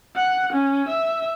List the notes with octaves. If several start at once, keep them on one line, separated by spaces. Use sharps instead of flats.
F#5
C#4
E5